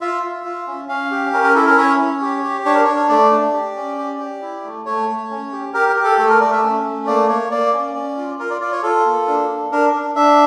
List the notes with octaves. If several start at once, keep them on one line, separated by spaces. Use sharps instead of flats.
F4 E5
F4
F4
C#4
C#4 F5
G4
C#4 A#4
A#4
E4 A4
A#4
C#4 C#5
C#4
G4
G4
D4 C#5
A#4
D4 C#5
A3 D5
D4
G4
C#4
G4
G4
E4
A3
A3 C#5
A3
C#4
G4
G4 A#4
A#4
G4
A4
A3 A4
A#4
A3 D5
E5
C#4
A3
A#3 D5
A#3 C#5
A#3 D5
C#4
C#4
F4
F4 A#4
D5
F4 D5
C#5
F4 A4
A#3
D4
D4
D4 A#4
D4
D4 E5